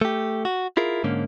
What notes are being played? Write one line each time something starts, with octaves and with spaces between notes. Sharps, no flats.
A3 G4
F#4
E4 F4 G#4 A#4
G#2 D3 A#3 C#4